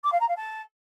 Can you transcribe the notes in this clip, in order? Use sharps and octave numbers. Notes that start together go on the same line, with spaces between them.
D6
F5
A#5
F5
A5